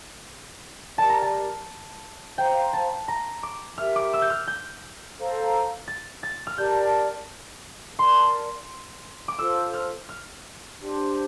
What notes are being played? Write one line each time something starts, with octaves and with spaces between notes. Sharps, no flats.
G4 A#4 D5 A5
A#5
A5
C5 F5 G5 A#5
A5
A#5
D6
G4 A#4 E5 F6
D6
E6
G6
F6
G6
A4 C5 F5 A#5
A6
A6
F6
G4 A#4 D5 A5 G6
A#4 D5 A5 C6
D6
F4 A4 C5 E6
F6
F6
D4 G4 C5